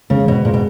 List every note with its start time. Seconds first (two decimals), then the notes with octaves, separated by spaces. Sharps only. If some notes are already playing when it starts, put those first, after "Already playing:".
0.10 C#3 G#3
0.27 G#2 B2
0.45 A#2 G#3
0.54 B2